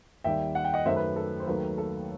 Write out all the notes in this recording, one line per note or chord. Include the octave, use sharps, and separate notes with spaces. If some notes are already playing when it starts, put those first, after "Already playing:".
D#2 D#3 G3 E5 G5
F#5
G5
D#5 F#5
F#2 D#3 A3 C5 E5
B4
A4
C5
D#2 D#3 F#3 A3 B4
A4